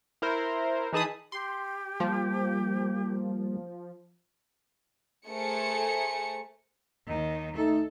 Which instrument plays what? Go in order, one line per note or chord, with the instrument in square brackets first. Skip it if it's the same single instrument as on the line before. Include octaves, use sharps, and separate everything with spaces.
[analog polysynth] E4 A#4 C5
E3 D#4 G#4 A5 B5 D#6
[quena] G4 [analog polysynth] C6
[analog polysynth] F3 [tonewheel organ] G3 A#3
[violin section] A3 G#4 A#4 C5 C#7
[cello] D#2 D#3
[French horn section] A3 D#4 [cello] A4